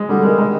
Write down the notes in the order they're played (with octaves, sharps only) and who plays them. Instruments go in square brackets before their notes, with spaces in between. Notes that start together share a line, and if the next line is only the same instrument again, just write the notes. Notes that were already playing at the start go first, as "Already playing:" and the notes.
Already playing: [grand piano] G#3
[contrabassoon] D3 [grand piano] G3
[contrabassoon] D#3 [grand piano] G#3
[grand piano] G#3